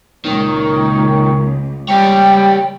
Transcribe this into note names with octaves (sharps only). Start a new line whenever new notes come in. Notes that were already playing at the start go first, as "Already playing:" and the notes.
C#2 A#2 D#3 A#4 C#5
G3 G4 C#5 G5